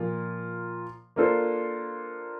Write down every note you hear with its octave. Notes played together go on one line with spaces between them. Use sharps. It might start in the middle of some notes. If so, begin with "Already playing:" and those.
Already playing: A#2 F3 A#3 F4
A#3 D4 F4 A4 C5